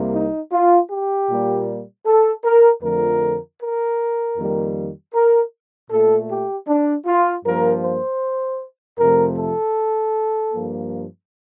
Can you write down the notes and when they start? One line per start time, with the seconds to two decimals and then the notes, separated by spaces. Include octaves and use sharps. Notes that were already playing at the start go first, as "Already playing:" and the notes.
Already playing: C2 C3 G3 A#3
0.14 D#4
0.52 F4
0.90 G4
1.29 A#2 G3 A#3
2.06 A4
2.44 A#4
2.83 F2 D3 F3 A3 A#4
3.60 A#4
4.37 F2 D#3 G3 A#3
5.14 A#4
5.90 A#2 A3 A4
6.29 G4
6.67 D4
7.06 F4
7.45 G2 F3 A#3 A#4
7.83 C5
8.99 F2 C3 F3 A3 A#4
9.37 A4
10.53 G2 F3 A#3